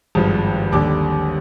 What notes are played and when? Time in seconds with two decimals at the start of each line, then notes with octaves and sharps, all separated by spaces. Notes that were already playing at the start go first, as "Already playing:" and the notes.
0.15 G#1 G2 F3 G#3
0.72 D#2 D3 G3 D6